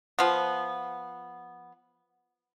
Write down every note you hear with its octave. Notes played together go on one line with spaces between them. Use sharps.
F3 B3